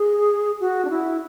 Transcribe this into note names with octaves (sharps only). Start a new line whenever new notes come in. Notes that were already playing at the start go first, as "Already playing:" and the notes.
Already playing: G#4
F#4
D4
E4